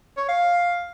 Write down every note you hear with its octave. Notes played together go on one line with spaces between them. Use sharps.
C#5
F5